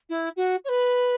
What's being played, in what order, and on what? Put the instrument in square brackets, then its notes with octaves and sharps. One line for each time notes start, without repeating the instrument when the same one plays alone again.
[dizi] E4
F#4
C#5
B4